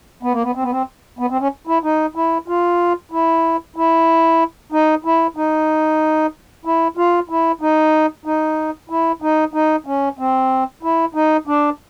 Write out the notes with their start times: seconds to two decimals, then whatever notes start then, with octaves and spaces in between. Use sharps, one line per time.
0.23 B3
0.33 A#3
0.43 B3
0.55 C4
0.63 B3
0.71 C4
1.19 B3
1.30 C4
1.40 C#4
1.67 E4
1.84 D#4
2.15 E4
2.48 F4
3.12 E4
3.76 E4
4.72 D#4
5.05 E4
5.37 D#4
6.65 E4
6.97 F4
7.29 E4
7.61 D#4
8.26 D#4
8.90 E4
9.22 D#4
9.54 D#4
9.86 C#4
10.19 C4
10.83 E4
11.15 D#4
11.47 D4